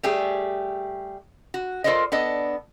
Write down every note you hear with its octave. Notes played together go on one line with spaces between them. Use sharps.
G3 A3 G4 G#4
F#4
F4 A4 A#4 C5 D5 D#5
B3 D4 A4 D#5